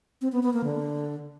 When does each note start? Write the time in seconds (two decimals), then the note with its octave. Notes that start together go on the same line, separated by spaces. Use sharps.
0.21 C4
0.32 B3
0.43 B3
0.53 A#3
0.64 D3